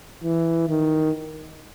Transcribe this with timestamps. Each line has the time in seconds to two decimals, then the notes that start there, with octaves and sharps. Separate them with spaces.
0.24 E3
0.69 D#3